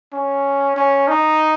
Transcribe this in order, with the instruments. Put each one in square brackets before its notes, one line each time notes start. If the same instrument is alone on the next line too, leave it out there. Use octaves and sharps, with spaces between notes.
[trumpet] C#4
C#4
D#4